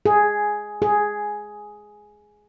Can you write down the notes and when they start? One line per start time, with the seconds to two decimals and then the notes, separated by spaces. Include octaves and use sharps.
0.06 G#4
0.82 G#4